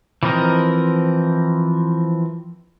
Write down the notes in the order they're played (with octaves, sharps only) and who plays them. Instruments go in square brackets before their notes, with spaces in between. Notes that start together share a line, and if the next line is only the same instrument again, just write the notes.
[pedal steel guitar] E3 F3 C4 A#4 D#5